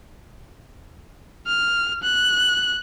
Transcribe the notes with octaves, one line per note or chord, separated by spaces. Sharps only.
F6
F#6